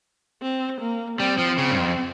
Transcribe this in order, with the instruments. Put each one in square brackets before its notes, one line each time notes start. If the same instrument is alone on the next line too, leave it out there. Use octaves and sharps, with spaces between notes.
[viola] C4
A#3
[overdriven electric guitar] G3 [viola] C4
[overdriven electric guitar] F3
C#3
G2
F2